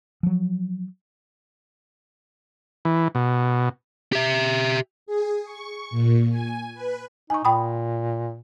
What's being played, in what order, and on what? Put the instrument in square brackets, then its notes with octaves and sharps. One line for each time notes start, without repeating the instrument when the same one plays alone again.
[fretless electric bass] F3 F#3
[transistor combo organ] E3
B2
[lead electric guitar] G4 E5
[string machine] G#4
C#6
A#2
G#5
B4
[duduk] D#4 [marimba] G#5 C#6
[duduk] A#2 [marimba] G5 B5 D#6